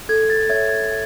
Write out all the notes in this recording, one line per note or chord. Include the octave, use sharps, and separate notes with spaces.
A4 G#6
A6
C#5 E5 G#6
G#6